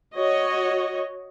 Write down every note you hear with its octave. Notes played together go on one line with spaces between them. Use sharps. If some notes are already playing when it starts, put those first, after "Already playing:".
F#4 C#5 D#5